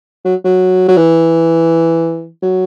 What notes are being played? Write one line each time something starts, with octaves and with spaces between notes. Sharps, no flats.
F#3
F#3
F#3
E3
F#3